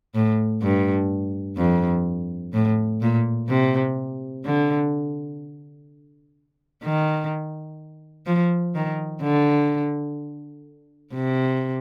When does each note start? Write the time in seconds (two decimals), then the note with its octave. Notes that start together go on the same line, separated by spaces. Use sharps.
0.15 A2
0.62 G2
1.57 F2
2.53 A2
3.01 A#2
3.49 C3
4.45 D3
6.84 D#3
8.26 F3
8.75 D#3
9.22 D3
11.14 C3